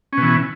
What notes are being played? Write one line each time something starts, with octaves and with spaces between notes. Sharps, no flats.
B2 E3 C#4